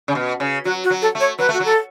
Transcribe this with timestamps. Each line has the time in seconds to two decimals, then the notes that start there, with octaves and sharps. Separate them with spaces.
0.08 C#3
0.15 B2
0.40 C#3
0.65 F#3 F#4
0.84 F#4
0.90 F#3
1.02 A4
1.15 A3
1.20 C#5
1.39 F#3 B4
1.49 A3
1.54 F#4
1.60 F#3 A4